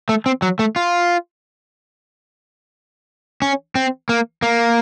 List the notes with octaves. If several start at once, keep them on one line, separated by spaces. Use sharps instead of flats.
A3
C4
F#3
A3
F4
C#4
C4
A#3
A#3